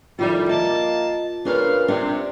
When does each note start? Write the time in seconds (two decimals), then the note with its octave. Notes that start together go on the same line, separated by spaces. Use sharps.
0.19 F2 D#3 G3 E4 F4
0.49 A#3 D#5 A5
1.45 A#2 C#3 D4 A#4 B4 F5
1.88 C3 D4